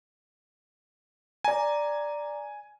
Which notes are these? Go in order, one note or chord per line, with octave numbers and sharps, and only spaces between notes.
D5 G#5 A#5